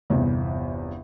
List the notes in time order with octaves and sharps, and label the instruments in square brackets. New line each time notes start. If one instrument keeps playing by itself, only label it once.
[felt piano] G1 E2 C3